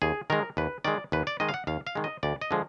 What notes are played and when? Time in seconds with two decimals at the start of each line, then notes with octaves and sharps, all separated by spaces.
0.02 D#2 G#4
0.30 D#3 G#3 A#4
0.57 D#2 B4
0.85 D#3 G#3 D5
1.12 D#2 B4
1.27 D5
1.40 D#3 G#3 D#5
1.49 F5
1.54 F#5
1.67 D#2 F5
1.87 F5
1.95 D#3 G#3
2.04 D#5
2.23 D2 D5
2.41 D#5
2.51 D3 F3 G#3